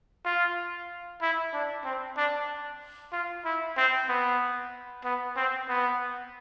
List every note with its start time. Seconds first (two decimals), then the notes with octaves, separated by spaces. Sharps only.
0.26 F4
1.22 E4
1.54 D4
1.85 C4
2.17 D4
3.13 F4
3.45 E4
3.77 C4
4.09 B3
5.05 B3
5.37 C4
5.69 B3